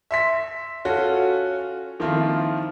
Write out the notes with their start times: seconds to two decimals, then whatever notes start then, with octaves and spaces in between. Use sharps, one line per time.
0.11 E5 C6 B6
0.85 C#4 F4 F#4 A4
2.00 D#3 F3 A#3 C4 E4 F4